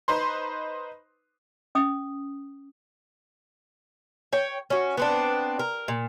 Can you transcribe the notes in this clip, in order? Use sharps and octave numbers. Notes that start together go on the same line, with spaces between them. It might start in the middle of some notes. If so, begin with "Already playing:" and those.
D#4 B4 C5 C6
C#4 D#6
C#5 G5
C#4 F#4
B3 C4 D4
A#4
A#2